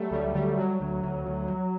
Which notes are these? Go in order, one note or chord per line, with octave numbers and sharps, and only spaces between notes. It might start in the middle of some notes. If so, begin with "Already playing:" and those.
Already playing: F#3 G3 A3
D2 G3
D3 G3
F#3 G3
D2
D2
D2
F#3